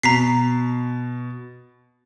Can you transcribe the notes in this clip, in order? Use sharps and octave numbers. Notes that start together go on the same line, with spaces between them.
B2 A#5 B6 C7